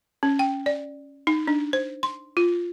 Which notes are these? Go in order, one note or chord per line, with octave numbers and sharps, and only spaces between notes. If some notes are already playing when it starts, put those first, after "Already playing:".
C#4
G5
D5
D#4
D4
C5
C6
F4